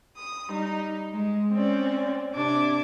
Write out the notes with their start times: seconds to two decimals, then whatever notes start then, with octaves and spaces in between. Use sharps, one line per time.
0.16 D#6
0.49 G3 D#4
1.14 G#3
1.52 C4 C#4 D5
2.34 C3 D4 D6 G#6